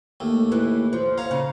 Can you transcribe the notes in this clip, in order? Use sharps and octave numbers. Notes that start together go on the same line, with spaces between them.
D#2 A3
E3
F3
C#5 F5 A#5
C#3